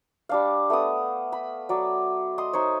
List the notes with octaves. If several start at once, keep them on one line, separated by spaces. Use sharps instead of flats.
G3 D4 F5
A3 B3 D#6
B5
F#3 D5
D#5 C6 D#6
D#4 C5 C#5